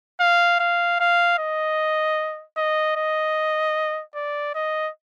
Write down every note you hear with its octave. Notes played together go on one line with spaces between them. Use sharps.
F5
F5
F5
D#5
D#5
D#5
D5
D#5